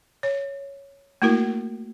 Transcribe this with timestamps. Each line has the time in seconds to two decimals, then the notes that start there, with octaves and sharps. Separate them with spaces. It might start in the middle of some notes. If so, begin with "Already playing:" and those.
0.23 C#5
1.22 A3 A#3 E4 F#4 A#4